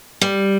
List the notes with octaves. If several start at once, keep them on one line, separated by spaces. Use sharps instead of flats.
G3